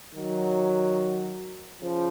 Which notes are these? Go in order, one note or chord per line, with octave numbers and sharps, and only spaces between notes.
D#3 F#3
C#3 F3